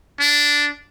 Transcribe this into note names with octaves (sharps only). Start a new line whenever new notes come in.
D4